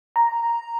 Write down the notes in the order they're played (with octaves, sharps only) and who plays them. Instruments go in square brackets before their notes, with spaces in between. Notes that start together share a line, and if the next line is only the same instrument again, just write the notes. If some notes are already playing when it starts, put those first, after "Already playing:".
[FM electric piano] A#5